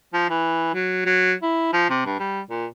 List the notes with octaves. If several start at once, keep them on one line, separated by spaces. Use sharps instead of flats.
F3
E3
F#3
F#3
E4
F3
C3
G2
G3
A#2